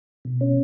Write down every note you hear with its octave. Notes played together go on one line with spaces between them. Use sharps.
B2
C#4